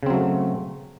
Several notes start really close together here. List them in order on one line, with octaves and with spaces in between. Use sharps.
C#3 C4 F#3 A3